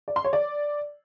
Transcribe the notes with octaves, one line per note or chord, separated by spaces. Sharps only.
D5
C6
C#5
D5